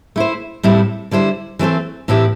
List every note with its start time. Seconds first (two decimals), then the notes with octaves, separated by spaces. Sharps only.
0.16 A3 E4 C5
0.63 A2 G3 C4 E4 A4
1.11 D3 G3 E4 C5
1.59 E3 A3 C4 A4 C5
2.08 A2 E3 C4 E4 G4